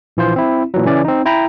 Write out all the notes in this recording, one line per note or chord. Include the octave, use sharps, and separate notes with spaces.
A#1 E3 F4 C5
C4 E4
A#2 E3 F#3
C#3 E3 C#4 D5
C4 D#4
E4 G5 A#5 B5